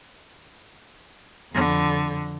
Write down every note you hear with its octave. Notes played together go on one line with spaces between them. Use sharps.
F2 D3